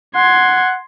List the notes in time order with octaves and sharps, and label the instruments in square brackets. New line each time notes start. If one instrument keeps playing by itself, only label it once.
[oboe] F#5 [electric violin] C6 G#6